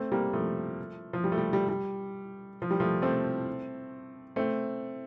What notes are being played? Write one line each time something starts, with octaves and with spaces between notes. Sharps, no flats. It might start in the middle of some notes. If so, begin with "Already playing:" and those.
Already playing: A3 C4
G3 A#3
F3 A3
F3
G3
A3
G3
G3
G3
F3
G3
F3 A3
A3 C4
A3 C4